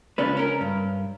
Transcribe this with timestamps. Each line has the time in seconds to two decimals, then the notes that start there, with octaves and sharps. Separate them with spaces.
0.18 C#2 C#4 D4 B4
0.37 C#4 A#4
0.61 G2